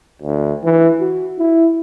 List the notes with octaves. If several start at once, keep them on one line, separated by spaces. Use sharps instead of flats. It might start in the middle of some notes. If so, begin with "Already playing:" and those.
D2
E3
F#4
E4